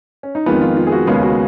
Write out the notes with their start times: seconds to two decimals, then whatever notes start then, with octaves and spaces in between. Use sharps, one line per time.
0.23 C#4
0.35 D#4
0.46 F2 D#3 G#3 B3 F4
0.61 F4
0.77 F4
0.87 G#4
0.92 F#4
1.07 D#2 C#3 G#3 B3 G#4
1.23 F#4